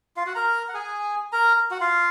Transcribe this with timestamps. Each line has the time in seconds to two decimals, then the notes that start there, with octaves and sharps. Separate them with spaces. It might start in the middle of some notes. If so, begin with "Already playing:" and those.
0.16 F4 F5
0.26 F#4 F#5
0.35 A#4 A#5
0.68 F#5
0.74 G#4 G#5
1.32 A#4 A#5
1.71 F#4 F#5
1.80 F4 F5